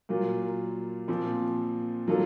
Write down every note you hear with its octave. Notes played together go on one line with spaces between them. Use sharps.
A#2 F#3 A#3 F4
A#2 F3 C4
D#3 F#3 A#3 F4 A4